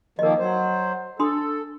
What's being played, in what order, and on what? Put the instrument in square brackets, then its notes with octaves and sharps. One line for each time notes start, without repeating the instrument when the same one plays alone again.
[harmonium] D#3 F3 A#3 [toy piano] A#4 D#5
[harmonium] F#3 C5
[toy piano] D4 C6 D#6 [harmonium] A4